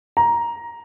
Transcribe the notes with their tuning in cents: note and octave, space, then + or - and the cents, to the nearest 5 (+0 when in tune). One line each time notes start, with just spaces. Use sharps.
A#5 +10